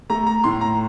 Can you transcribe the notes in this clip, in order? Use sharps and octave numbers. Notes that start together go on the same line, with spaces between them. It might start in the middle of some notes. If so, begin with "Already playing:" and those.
A3 A#5
A#5
A2 C6
A#5